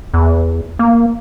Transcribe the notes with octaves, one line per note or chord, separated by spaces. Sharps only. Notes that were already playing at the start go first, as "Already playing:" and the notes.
E2
A#3